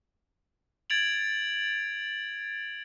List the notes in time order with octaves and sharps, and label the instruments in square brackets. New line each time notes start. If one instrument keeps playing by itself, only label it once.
[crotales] G#6 A6 D7 F7 F#7